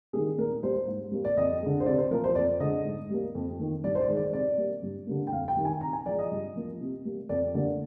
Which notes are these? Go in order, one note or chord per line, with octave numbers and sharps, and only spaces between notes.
D#3 G3 A#3 G#4
A#2 A#4
G3 A#3 C5
G#2
G3 A#3
D5
F2 D#5
D3 G#3
C5
C3 D5
C5
F3 A#3 A#4
C5
F2 D5
D3 G#3 D#5
G#2
G3 A#3
F2
D#3 A#3
G2 D5
C5
D5
D#3 G#3
D5
C3 D5
G3 A#3
G2
D3 G3 A#3
G5
F2 F5
G5
D#3 G3
G#5
C3 A#5
G#5
F3 G#3 D5
D#5
G2
F3 A#3
C3
G3 A#3
F2 D5
D3 G3 A#3 D5